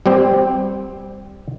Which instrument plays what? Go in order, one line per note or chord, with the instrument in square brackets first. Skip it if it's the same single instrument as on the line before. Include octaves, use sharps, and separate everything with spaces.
[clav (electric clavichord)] G3 C4 G4 C5